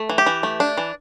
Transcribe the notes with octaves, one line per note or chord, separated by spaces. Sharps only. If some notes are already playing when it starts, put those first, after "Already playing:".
Already playing: A3
E3
G4
E3
A3
D4
E3